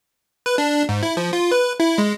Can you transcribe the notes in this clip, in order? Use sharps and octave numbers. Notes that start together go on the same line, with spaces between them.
B4
D4
G#2
E4
F3
F4
B4
E4
G#3